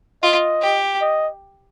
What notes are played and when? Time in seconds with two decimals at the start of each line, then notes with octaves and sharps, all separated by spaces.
0.23 F4 D#5
0.61 G4
1.01 D#5